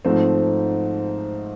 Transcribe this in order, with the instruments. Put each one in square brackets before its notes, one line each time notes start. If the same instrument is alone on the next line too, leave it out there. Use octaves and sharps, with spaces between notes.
[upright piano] G#2 F3 A3 C4